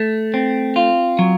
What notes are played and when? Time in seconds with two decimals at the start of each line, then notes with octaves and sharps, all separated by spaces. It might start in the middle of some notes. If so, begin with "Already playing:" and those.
Already playing: A3
0.34 C4
0.76 F4
1.19 F#3